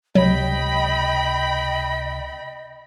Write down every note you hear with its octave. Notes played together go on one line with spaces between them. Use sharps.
C#2 C3 F#3 D#5 G5 B5